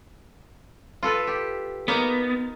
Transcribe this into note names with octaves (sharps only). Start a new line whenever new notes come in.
F4 A4 B4
G4
A#3 B3 D#4